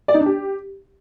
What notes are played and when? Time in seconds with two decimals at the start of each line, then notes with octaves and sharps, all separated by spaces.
0.08 D5
0.14 D#4
0.20 D4
0.26 G4